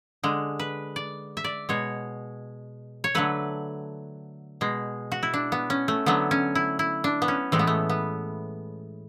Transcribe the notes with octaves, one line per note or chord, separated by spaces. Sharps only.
D3 G#3
B4
D5
E5
D5
B2 G#3 C#5
C#5
D3 F#3 A3 B4
B2 G#3
F#4
E4
D4
B3
C#4
A3
D3 F#3 A3 B3
C#4
E4
E4
D4
B3
C#4
A2 E3 G#3 A3
B3
A3
B3